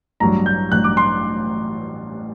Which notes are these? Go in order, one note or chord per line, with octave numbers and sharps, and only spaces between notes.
A1 G2 F#3 A#5
G6
A1 G2 F#3 F#6
D6
C6